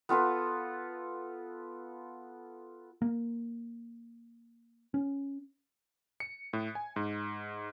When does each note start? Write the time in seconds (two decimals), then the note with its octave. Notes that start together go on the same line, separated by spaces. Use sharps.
0.09 B3 F4 A4 B4
3.02 A#3
4.94 C#4
6.20 C#7
6.53 A2
6.75 G#5
6.96 G#2